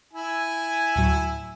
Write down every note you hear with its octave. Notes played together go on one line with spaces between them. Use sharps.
E4 G#5
D2 A2 F#3